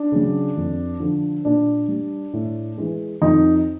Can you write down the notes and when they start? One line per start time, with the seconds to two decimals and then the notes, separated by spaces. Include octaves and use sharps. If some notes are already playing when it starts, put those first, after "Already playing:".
Already playing: D4
0.12 C#3 F#3
0.57 F2
1.00 D3 F3
1.45 A#2 D4
1.88 G3
2.33 A2
2.78 E3 G#3
3.22 F2 D#4